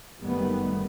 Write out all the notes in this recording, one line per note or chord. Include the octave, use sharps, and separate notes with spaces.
F#1 F#2 D#3 G3 A3 B3